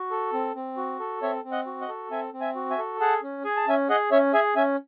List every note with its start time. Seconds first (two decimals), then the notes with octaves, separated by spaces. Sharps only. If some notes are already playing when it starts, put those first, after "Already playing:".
Already playing: F#4
0.11 A4
0.33 C4
0.55 C4
0.77 F#4
0.99 A4
1.22 C4 C#5 E5
1.44 C4
1.52 D#5 F#5
1.66 F#4
1.81 D#5 F#5
1.88 A4
2.11 C4 E5 G#5
2.33 C4
2.40 E5 G#5
2.55 F#4
2.70 E5 G#5
2.78 A4
3.00 G#4 F#5 A5
3.22 C#4
3.44 G#4 G#5
3.56 A5
3.67 C#4 E5 G#5
3.89 G#4 D#5 F#5
4.11 C#4 C#5 E5
4.33 G#4 E5 G#5
4.56 C#4 E5 G#5